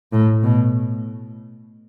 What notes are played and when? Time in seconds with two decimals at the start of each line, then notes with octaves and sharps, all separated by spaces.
0.12 A2
0.43 B2